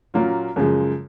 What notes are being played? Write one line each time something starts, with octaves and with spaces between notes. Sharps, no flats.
A#2 F#3 A#3 C#4 F4
F#2 C#3 F3 G#3